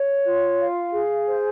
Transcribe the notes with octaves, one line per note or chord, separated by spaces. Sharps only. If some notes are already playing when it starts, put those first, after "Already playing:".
Already playing: C#5
F4
F5
G#4
C5